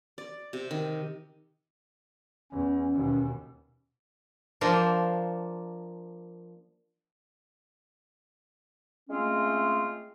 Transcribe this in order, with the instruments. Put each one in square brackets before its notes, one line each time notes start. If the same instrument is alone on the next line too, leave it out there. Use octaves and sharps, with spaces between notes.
[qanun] D5
C3
D#3
[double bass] E2 [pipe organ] C#4
[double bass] D#2 B2
[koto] F3 A#3 D4 A#4 C5
[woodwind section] G#3 A3 C4 C#4 F4